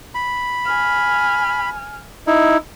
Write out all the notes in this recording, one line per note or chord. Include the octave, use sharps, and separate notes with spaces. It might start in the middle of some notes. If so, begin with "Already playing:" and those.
B5
G#5 F6
D#4 E4